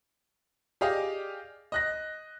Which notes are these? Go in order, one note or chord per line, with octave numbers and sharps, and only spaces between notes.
G4 G#4 D5 D#5 F5
D#5 F#6 A#6